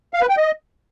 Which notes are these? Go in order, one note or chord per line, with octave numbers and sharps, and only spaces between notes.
F5
B4
G5
D#5